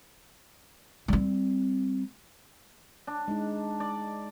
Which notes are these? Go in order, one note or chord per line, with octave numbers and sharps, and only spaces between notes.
G3 C4
D4
G#3 D#4
D5